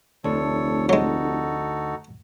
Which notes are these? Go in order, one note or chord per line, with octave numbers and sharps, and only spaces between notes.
F1 D2 A3 A4 C#5
F#3 G#3 D#4 F#4 A4